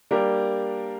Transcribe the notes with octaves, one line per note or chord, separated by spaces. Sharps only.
G3 A#3 D4 G4 A#4